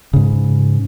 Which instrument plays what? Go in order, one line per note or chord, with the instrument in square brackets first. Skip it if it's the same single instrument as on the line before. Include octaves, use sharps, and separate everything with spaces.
[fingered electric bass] G#2 C#3